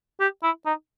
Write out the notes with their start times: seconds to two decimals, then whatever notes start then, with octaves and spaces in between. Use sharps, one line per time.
0.20 G4
0.43 E4
0.66 D#4